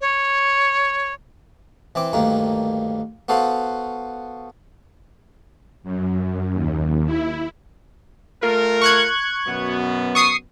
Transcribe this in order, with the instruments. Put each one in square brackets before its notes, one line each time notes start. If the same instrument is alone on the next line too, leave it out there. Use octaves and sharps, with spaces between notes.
[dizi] C#5
[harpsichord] E3 C4 D6
D2 G2 D#3 A#3
B3 F#4 A4 C5 F5
[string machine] F#2
D#2
E4
[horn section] A3 F4 A#4
[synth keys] C#6 F#6 G#6
[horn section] F#2 B2 B3
[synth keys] C#6 D#6 C7